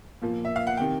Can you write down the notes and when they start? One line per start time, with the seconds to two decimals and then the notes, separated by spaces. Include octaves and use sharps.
0.22 A#2 F3 A#3
0.45 E5
0.56 F5
0.67 F#5
0.77 C3 D#3 G5